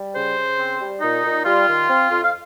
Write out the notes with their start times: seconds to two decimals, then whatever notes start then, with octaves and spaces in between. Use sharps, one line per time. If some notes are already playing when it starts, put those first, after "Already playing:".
Already playing: G3
0.15 C#3 C5
0.37 C#3
0.58 C4
0.80 G3
1.01 A#2 D#4
1.24 A#2
1.45 G3 F4
1.67 D#3
1.88 C4
2.10 F2
2.24 F5